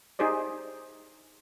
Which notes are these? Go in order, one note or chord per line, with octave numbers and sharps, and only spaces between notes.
D#4 G4 G#4 C5 D5